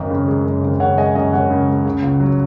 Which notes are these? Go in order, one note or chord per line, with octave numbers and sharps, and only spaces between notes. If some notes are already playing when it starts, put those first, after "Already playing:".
Already playing: G#1 F#2 A#4 D#5
C#3
G#3
F#2
G#1
C#3 C#5 F#5
G#3 D#5 G#5
F#2 D#5 G#5
G#1 C#5 F#5
C#3
G#3
C#3
C#2
F#3